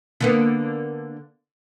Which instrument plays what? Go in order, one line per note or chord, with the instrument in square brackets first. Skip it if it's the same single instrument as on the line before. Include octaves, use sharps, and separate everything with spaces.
[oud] D3 A#3 B3